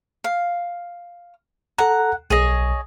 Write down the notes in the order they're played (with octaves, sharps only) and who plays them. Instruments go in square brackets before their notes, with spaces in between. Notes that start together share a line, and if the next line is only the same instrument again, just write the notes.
[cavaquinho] F5
[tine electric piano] A4 A#5 [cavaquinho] F#5
[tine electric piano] B1 [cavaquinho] G#4 C#5 D#5